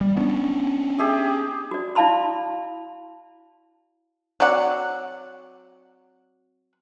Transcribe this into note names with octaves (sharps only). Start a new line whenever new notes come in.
G3
B3 C#4 D4
G4 G#4 E5
F#4 D5
E4 D5 F5 A5 B5 C6
F#3 C4 D5 F#5